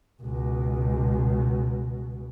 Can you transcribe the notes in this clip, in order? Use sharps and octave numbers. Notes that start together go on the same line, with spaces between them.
C#2 B2